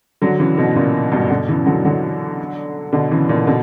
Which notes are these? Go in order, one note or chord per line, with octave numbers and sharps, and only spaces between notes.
D3 F#3
C#3 E3
B2 D3
A#2 C#3
G2 B2
B2 D3
C#3 E3
D3 F#3
D3 F#3
B2 D3
C#3 E3
A#2 C#3
B2 D3